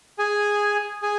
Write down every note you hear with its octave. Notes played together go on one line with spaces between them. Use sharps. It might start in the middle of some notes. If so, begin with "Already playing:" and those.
G#4 G#5
G#4 G#5